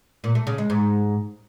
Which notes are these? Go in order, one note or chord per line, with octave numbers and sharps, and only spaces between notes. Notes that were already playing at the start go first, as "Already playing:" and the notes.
A#2
A3
C#3
G#3
G#2